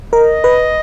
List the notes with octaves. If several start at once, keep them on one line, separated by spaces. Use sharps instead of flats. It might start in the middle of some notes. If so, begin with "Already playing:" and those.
A#4 D#5
B4